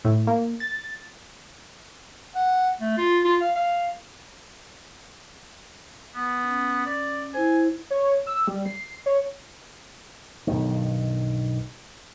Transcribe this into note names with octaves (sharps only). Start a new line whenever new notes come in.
A2
A#3
A6
F#5
A3
F4
F4
F5
F5
B3
C#4
D5
E4 C5 G#5
C#5
E6
G3
C7
C#5
B1 G2 D#3